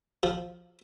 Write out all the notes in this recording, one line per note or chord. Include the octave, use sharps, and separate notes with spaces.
F3